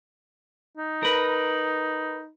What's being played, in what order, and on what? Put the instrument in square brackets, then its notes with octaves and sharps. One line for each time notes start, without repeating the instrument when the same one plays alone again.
[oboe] D#4
[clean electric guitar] A#4 B4